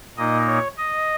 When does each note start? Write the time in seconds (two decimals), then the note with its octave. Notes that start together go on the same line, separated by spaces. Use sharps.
0.17 A#2 A#3 D#4 D#5
0.47 C#5
0.77 D#5